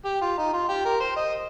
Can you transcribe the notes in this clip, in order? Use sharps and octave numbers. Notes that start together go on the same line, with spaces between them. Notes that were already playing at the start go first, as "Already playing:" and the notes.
G4
F4
D#4
F4
G4
A#4
C5
D#5